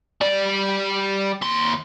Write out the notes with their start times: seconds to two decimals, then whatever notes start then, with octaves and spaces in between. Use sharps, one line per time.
0.21 G3 D5
1.42 D#2 C6